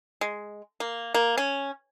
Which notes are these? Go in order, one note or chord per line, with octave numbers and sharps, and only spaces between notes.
G#3
A#3
A#3
C#4